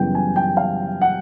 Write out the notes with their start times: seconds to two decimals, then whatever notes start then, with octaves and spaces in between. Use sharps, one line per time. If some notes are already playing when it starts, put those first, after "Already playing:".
Already playing: F#2 C#3 E3 G3 B3 G5
0.15 G#5
0.36 G5
0.57 F5
1.01 F#5